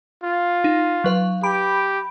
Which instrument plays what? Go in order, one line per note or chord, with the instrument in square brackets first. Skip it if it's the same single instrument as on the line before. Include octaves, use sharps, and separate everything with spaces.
[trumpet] F4
[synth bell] D#4
F#3 B4 F5
[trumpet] G4 [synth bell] B5 D7